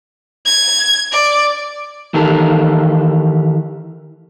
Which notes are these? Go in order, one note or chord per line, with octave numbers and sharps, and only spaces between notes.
G#6
D5
D#3 E3 G4 A4 A#4